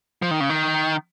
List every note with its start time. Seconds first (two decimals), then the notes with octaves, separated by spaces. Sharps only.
0.22 F3
0.31 D#3
0.40 C#3
0.50 D#3